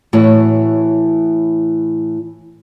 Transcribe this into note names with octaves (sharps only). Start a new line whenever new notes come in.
A2 E3 F#4 C#5